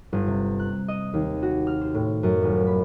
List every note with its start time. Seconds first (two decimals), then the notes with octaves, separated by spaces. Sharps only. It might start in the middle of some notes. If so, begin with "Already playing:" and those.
0.13 G1
0.27 C3
0.59 F#6
0.88 D#5
1.14 D#2
1.43 F#4
1.67 F6
1.81 C5
1.94 A2
2.23 F#2
2.42 D#1
2.67 B5